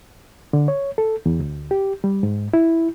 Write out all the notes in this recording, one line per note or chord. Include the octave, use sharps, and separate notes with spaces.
D3
C#5
A4
E2
D2
G4
G3
G#2
E4